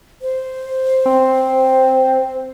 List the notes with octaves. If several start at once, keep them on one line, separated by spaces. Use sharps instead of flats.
C5
C4